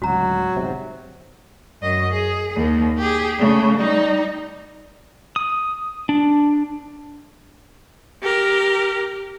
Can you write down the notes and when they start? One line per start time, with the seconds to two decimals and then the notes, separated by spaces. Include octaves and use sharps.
0.02 D1 C#2 F#3 F#4 A#5
0.57 G1 G#2 C3
1.81 F#2 D#5
2.13 G#4
2.56 D#2
2.98 G4 G#4
3.39 C#3 A3
3.77 G3 D#4
5.36 D#6
6.09 D4
8.23 G4 A#4